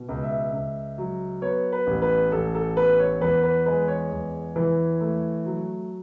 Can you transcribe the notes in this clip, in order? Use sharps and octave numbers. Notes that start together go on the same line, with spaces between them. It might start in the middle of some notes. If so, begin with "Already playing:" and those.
Already playing: B2
C#2
E5
C#2
F#3
B3 C#5
B4
A1
B4
A1 A4
A4
B3 B4
C#5
E2 B4
B4
G#3 B4
C#5
E2
E3
A3
F#3